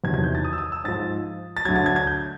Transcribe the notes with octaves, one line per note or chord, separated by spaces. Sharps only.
E2 C3 D#3 F#3 G#6
G#6
G6
A6
D#6
E6
D#6
E6
G#2 F3 A6
A6
D2 D3 F#3 G#6
A6
G#6
G#6
G6